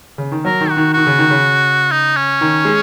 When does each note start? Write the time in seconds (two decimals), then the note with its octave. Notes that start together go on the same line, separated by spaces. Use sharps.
0.18 C#3
0.32 D#3
0.45 F#3 A#4
0.61 D#3
0.70 F#4
0.77 D#3
0.94 D#3 F#4
1.07 C#3
1.19 D#3
1.30 C#3
1.92 D#4
2.17 C#4
2.41 D#3
2.65 G#3